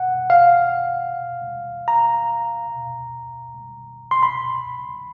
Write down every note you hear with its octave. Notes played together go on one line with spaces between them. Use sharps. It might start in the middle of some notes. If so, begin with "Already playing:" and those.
Already playing: F#5
F5
A#5
C6
B5